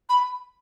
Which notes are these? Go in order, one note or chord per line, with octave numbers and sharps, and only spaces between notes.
B5